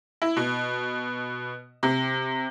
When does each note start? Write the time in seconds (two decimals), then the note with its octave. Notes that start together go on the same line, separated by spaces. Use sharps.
0.22 E4
0.37 B2
1.83 C3